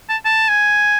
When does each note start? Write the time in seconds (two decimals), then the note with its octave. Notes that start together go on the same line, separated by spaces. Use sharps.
0.09 A5
0.25 A5
0.49 G#5